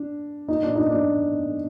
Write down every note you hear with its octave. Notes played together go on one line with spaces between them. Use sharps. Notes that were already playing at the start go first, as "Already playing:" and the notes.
Already playing: D4
D#4
D4
D#4
D4